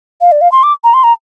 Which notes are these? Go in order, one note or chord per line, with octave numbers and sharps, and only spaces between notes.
F5
D5
F5
C6
D6
A#5
C6
A#5